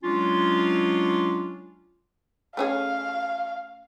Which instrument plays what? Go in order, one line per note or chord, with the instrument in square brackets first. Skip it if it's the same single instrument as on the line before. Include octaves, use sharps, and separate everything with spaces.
[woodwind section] F#3 G#3 C#4 D4 F4
[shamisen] A3 C#4 G#4 [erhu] F5